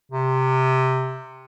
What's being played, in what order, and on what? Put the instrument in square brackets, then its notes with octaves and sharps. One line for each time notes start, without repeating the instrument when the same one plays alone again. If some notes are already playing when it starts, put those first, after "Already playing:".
[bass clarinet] C3